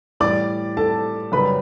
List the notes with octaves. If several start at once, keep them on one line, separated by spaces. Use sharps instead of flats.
A2 E3 G3 D5 D6
A4 A5
F#2 C#3 G3 B4 B5